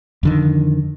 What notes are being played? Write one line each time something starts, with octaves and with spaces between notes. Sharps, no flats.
F2 D3 D#3